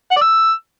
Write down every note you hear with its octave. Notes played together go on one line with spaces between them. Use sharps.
F#5
D5
E6